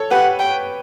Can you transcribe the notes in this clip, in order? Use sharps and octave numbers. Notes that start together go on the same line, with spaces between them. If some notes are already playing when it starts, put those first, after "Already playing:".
Already playing: A4 C#5
G4 B4 F#5
G5